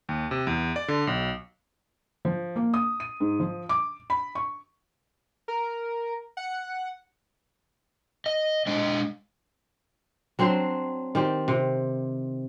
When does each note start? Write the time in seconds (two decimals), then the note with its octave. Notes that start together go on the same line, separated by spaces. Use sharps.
0.09 D#2
0.31 C3
0.47 E2
0.76 D5
0.88 D3
1.07 B1
2.25 F3
2.56 A#3
2.74 D#6
3.00 D#7
3.20 G#2
3.40 F3
3.69 D6
4.10 B5
4.35 C#6
5.48 A#4
6.37 F#5
8.26 D#5
8.67 G#3 D4 D#5
10.39 F#3 C4 D4 C5
11.15 D#3 C4 G4 D5
11.48 C3